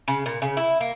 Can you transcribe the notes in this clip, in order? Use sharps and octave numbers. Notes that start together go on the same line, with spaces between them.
C#3
A#2
C#3
E4
A#3